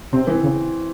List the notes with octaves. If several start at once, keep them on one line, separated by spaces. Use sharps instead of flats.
C3 C4
E3
C#3